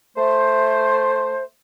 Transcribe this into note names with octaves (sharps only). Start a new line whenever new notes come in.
A3 C5